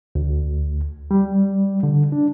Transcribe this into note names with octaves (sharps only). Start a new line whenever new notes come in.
D2
G3
D3
D4